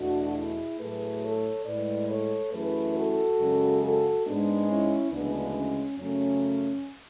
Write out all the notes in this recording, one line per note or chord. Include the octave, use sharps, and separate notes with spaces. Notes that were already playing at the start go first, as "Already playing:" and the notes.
Already playing: E2 B2 A3 D4 F#4
E4 G#4
A2 F#3 A3 G#4 B4
A4 C#5
A2 G#3 B4 D5
A4 C#5
F#2 E3 A3 G#4 B4
F#4 A4
F#2 C#3 G#3
F#4 A4
G#2 G#3 B3 D4
C#4 E4
D2 C#3 E3 G#3 B3 D4
C#4
F#2 C#3 F#3 A3 C#4